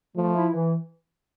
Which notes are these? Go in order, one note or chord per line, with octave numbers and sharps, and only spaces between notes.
F3 A3
E4
E3